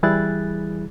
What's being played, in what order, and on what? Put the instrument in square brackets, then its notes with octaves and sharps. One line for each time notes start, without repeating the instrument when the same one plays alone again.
[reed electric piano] E3 G3 E4 G#4 F#6 A6